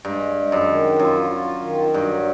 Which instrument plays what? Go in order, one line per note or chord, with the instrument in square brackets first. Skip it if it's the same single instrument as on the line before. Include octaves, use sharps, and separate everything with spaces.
[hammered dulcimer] G2 [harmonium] G#3
[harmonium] G#3
[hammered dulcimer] F#2
[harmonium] D#3
[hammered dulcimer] F#2 [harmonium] F4
[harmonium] F4
D#3
[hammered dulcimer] G2 [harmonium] F#3